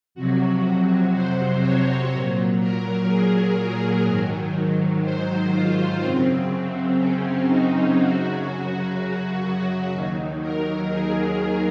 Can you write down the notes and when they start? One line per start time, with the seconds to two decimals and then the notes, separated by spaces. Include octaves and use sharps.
0.15 F2 C3 F#3 F#4
1.13 C5
1.61 C#5
2.10 A#2 F#3
2.59 A#4
3.07 G#4
4.06 G#2 D#3 F#3
5.03 C5
5.52 F4
6.01 F#2 C#3 F#3 C4
6.98 C#4
7.48 D#4
7.96 F#2 C#3 F#3 F#4
8.94 F#4
9.92 D#2 D#3 F#3
10.41 A#4
10.90 G#4